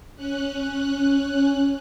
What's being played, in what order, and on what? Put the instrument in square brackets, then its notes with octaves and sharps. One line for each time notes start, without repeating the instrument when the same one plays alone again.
[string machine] C#4 F#6